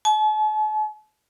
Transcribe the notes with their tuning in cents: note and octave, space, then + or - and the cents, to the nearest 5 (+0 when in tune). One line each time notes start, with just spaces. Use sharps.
A5 -45